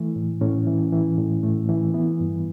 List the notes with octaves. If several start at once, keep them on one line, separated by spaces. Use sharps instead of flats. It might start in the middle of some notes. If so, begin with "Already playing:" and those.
Already playing: E3 A3
A2
A2 C#4
E3
E3
A2
A2 A3
E3
E3 B3
G2